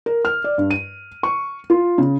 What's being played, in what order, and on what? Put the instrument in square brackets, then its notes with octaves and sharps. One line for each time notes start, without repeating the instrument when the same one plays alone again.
[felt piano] A#4
F6
D5
G2
D#7
C#6
F4
C#3